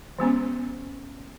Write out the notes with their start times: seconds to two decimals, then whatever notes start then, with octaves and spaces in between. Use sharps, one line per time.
0.19 E3 G#3 B3 C#4